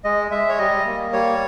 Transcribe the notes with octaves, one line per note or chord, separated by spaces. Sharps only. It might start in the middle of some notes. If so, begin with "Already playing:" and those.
G#3 D#5
G#3 E5
C#5
G3 D#5
A#3
G3 C#5